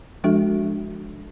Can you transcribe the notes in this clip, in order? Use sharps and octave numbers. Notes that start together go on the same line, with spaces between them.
F3 G#3 D4 F#4 A4 E5